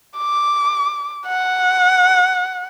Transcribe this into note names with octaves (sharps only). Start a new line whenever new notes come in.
D6
F#5